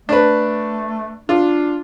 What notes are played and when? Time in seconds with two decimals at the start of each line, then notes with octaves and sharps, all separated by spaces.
0.09 A3 D4 B4
1.29 D4 F4